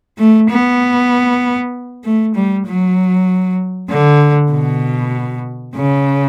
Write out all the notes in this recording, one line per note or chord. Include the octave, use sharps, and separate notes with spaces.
A3
B3
A3
G3
F#3
D3
B2
C#3